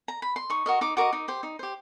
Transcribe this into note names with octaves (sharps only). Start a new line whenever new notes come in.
A#5
B5
C6
D#4 C#6
F#4 A#4 D#5
D#4 D6
F#4 A#4 D#5 D6
D#4
G4 C5
D#4
G4 C5